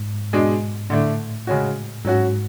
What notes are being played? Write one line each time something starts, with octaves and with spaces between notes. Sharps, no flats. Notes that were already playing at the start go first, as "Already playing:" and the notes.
Already playing: G#2
B2 G#3 D4
A2 D3 A3 D4
C#3 G#3 C#4 F#4
G#2 F#3 C#4 F#4